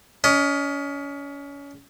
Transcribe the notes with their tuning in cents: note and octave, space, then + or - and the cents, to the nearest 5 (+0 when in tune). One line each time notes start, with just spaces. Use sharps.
C#4 +30 D#5 +0